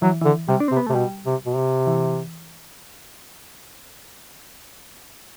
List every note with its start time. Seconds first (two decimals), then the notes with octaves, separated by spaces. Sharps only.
0.02 E3 F#3
0.21 E3
0.25 D3
0.49 C3 G3
0.60 D4
0.68 C3 C4
0.77 B3
0.87 C3 A3
0.95 B2 G3
1.26 C3
1.46 B2
1.56 C3
1.87 E3